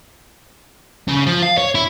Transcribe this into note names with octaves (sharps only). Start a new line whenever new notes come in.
C#3
F3
F5
C#5
E4